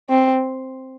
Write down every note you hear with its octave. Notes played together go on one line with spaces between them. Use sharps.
C4